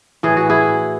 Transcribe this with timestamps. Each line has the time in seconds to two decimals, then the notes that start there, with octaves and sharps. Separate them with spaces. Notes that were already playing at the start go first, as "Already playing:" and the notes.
0.23 A2 E3 G#4
0.37 F#4
0.50 E4 G#4